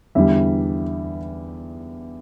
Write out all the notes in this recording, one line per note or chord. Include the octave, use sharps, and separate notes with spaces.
E2 D3 G3 E5